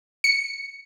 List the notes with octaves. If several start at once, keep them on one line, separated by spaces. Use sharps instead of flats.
C#7